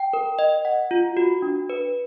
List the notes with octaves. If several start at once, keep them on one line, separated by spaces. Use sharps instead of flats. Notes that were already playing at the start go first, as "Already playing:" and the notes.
Already playing: G5
A#4
D#5
F#5
F4
F#4
D4
B4